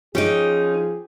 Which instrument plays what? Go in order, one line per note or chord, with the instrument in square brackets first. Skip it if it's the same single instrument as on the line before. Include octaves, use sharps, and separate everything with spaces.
[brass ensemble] F3 G#4 [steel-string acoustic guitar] C#4 D#4 [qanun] G4 G5